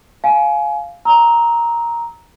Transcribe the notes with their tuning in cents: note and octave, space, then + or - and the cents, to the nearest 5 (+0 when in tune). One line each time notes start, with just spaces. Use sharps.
F5 +0 G#5 +25
A#5 +5 E6 -40